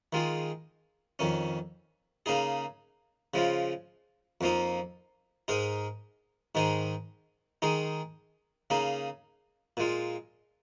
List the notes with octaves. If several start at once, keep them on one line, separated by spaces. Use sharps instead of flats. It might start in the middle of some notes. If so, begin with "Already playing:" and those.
D#3 G#3 F4 G#4
F2 D#3 C#4
C#3 A#3 D#4 G#4
C#3 F3 G#3 F4
F2 F3 A#3 D#4
G#2 G#3 D#4 A#4
G#2 D#3 G#3 D#4 G#4
D#3 G#3 D#4 G#4
C#3 A#3 D#4 G#4
A#2 G#3 F4